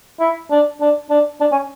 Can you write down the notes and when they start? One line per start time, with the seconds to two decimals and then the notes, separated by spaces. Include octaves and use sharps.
0.20 E4
0.51 D4
0.81 D4
1.10 D4
1.41 D4
1.52 C#4